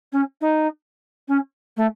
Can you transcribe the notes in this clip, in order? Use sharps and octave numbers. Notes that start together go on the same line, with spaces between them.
C#4
D#4
C#4
A3